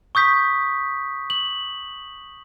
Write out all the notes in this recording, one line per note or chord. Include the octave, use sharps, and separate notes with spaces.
C#6 D#6 G6 B6
F#7